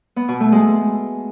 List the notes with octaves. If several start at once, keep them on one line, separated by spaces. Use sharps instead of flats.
B3
B2
A3
G#3